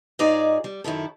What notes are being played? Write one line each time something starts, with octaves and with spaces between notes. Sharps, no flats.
G#2 D#4 F4 G#4 D5
G3
F#2 D#3 E4 A4